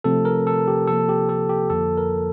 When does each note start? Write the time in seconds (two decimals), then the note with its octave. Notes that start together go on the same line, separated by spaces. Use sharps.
0.04 C3 F3 A3 C4 A4
0.25 A#4
0.47 A4
0.68 G4
0.87 C3 F3 A#3 A4
1.09 G4
1.29 A4
1.49 G4
1.70 F2 D3 F3 A#3 A4
1.98 A#4